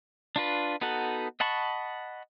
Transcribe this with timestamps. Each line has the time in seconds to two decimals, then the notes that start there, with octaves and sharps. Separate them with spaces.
0.36 D4 F4 B4
0.81 B3 D#4 F#4 A4 F#5
1.40 D#5 F#5 A5 B5 C#6